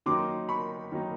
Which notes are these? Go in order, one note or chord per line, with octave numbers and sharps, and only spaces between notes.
D#3 F#3 A#3 D#4 C6 D6
B5 C#6
D#3 F#3 A#3 D#4